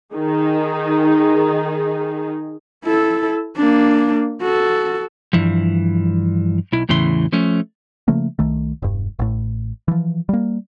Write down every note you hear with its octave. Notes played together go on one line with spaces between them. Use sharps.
D#3 D#4 G#4
E4 A4
A#3 D4
F#4 A4
G2 E3 F3
B1 E4
E2 A2 C#3 E3 C6
F3 A3 C#4
C#3 F3 A3 A#3
C2 D#3 A3
E1 G2
A1 A2
E3 F3
G3 A#3